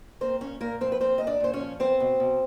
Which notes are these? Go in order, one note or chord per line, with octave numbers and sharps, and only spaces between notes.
A#3 C4 C5
A#2 C#4 C#5
A#2 A#3 A#4
F3 C4 C5
B4
A#3 C4 C5
A#2 D#5
D4 D5
A#2 C5
C#4 C#5
F3
B3 C4 C5
B2
B2